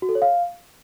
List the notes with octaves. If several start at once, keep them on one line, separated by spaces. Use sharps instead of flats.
F#4
A4
C#5
F5